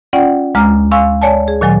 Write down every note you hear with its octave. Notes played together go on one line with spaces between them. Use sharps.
C#4 F4 D5 F#5 G5
D2 G#3 A#5 D6 F6
F5 G#5 C6 C#6 E6
C#5 D5 G#5 A5
G#4
A#2 D#3 F#3 G#5 A6